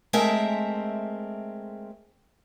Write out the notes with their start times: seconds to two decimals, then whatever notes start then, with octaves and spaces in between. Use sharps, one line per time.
0.13 G#3 A3 C4 A#4 E5